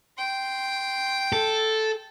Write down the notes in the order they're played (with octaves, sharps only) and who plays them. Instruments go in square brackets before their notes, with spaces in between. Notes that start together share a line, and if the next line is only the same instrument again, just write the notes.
[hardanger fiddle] G5 C6
[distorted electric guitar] A4